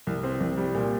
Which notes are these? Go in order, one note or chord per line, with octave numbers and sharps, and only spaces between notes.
C2
C4
C2
G3
A#2